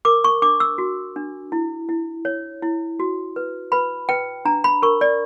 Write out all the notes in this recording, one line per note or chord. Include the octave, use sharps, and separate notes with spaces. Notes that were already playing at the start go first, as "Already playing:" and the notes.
A#4 D6
C#6
D4 D6
E6
F#4
D4
E4
E4
C#5
E4
F#4
B4
B4 B5
B4 G5
D4 A#5
B5
A#4 C#6
D5